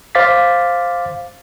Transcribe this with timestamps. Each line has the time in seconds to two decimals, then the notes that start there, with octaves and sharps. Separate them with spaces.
0.15 C5 F5 D6 A6 B6